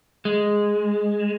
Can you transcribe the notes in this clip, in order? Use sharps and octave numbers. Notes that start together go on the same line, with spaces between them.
G#3